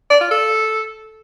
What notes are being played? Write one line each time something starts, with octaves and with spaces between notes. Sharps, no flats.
D5
F4
A4